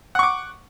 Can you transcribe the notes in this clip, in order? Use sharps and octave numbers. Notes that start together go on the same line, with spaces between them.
F#5 C#6 D6